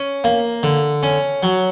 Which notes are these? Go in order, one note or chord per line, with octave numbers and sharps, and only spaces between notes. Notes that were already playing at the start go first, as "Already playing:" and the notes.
Already playing: C#4
A#3
D3
C#4
F#3